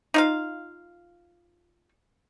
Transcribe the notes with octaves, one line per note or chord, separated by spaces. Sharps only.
D#4 F4 F5